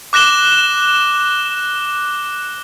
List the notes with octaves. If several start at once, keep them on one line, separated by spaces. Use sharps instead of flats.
D6 F#6 A#6 E7 G7